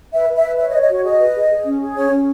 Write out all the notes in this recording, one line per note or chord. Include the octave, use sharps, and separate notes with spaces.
B4 E5
B4
E5
B4
C#5 E5
D#5
C#5
D#5
F#4 C#5
G#4 D#5
B4
G#4
G#4
C#4
G#4
C#4 C#5
C#4